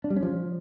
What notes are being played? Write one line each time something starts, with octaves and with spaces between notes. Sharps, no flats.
D4
G3
C#4
F3